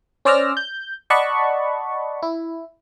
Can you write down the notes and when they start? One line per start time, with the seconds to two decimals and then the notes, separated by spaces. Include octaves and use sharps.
0.25 C#4 C5 D5 E6 F6 A#6
0.57 G6
1.10 D5 D#5 F#5 A5 B5 C#6
2.22 E4